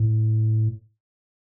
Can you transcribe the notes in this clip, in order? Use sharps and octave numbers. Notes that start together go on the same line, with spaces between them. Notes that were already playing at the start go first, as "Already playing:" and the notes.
Already playing: A2